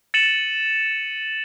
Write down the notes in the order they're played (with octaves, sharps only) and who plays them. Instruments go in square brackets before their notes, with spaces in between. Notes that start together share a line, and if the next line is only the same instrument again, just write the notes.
[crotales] A6 C#7 D#7 E7 F#7